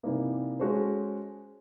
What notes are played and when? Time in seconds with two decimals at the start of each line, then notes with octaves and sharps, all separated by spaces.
0.03 C3 E3 G3 A#3 D#4
0.60 G#3 C#4 F#4 A4 C5